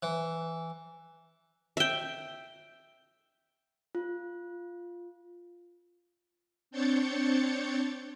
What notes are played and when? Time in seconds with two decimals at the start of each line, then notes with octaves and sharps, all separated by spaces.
0.03 E3
1.77 E5 G5
3.95 F4
6.71 C4 D4 C#5 G6 A6 C#7